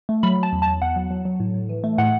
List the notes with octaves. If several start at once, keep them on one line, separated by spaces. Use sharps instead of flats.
A3
F#3 B5
F#3 A5
E2
A5
E2
E2 F#5
F#3
F#3
F#3
A2
A2
E3
A3
A2 F#5